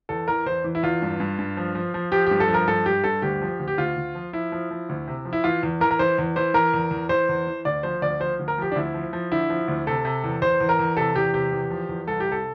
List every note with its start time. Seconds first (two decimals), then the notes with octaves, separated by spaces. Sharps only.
0.09 E2 A4
0.28 E3 A#4
0.46 E2 C5
0.64 E3
0.75 E4
0.83 E2 F4
1.02 G2
1.20 G2
1.39 G2
1.57 F3
1.75 F3
1.94 F3
2.12 F3 G4
2.26 G2 G4
2.40 A4
2.48 F3
2.54 A#4
2.67 G2 A4
2.86 G2 G4
3.04 G2 A4
3.22 D2 G4
3.42 F3
3.59 D2
3.68 G4
3.77 D2 F4
3.96 D2
4.15 F3
4.33 F3 E4
4.52 F3
4.71 F3
4.89 D2
5.07 C3
5.25 F3
5.33 E4
5.44 E3 F4
5.63 E2
5.81 E3 A#4
5.91 A#4
5.99 E3 C5
6.18 E2
6.36 E3 C5
6.54 E3 A#4
6.74 E2
6.91 E2
7.09 E3 C5
7.29 E2
7.47 E3
7.65 D2 D5
7.83 F3 C5
8.02 D2 D5
8.20 F3 C5
8.39 D2
8.48 A#4
8.58 F3 G4
8.72 D4
8.75 D2 E4
8.94 F3
9.13 F3
9.32 D3 E4
9.50 F3
9.68 D2
9.87 C3 A4
10.05 C3
10.24 E2
10.42 E2 C5
10.60 E2
10.69 A#4
10.79 E2
10.97 C3 A4
11.15 E2 G4
11.34 C3 G4
11.52 E2
11.71 F3
11.89 E2
12.07 C2 A4
12.20 G4
12.26 C3
12.32 A4